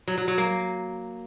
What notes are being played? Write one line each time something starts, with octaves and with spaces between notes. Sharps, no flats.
F#3
F#3
F#3
A#3